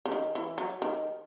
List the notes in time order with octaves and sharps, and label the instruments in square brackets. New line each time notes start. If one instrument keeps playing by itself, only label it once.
[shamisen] C#3
D#3
E3
F#3
D#3